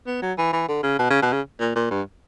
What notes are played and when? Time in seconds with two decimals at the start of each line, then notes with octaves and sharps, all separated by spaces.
0.07 B3
0.22 F#3
0.38 E3
0.53 E3
0.68 D3
0.83 C#3
0.99 B2
1.10 C#3
1.22 B2
1.33 C#3
1.60 A#2
1.75 A#2
1.91 G2